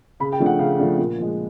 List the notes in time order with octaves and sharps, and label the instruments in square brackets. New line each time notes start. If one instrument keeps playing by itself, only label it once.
[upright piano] C#3 B5
G5
F3 A3 D4
F#5
C#3 F5
F3 A3 D4
A#2
F3 G#3